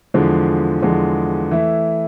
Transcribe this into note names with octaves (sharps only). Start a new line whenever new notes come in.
E2 D3 F3 G#3
E2 D3 F3 G#3
E3 A3 E4